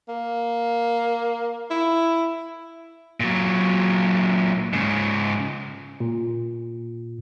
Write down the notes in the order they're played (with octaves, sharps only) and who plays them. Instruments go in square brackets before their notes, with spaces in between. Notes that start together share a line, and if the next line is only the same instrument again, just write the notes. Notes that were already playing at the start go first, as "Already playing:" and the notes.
[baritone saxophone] A#3
E4
[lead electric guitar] A#2 F#3
G#2 C#3
[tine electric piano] A#2